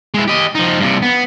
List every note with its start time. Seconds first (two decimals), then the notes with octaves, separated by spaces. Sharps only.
0.14 G#3 E4
0.28 G4 D#5
0.55 F3 D#4
0.80 G2 C3
1.02 B3